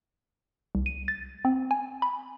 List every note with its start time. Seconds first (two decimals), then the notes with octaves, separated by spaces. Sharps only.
0.75 C2
0.86 D#7
1.08 A6
1.45 C4
1.71 G#5
2.02 B5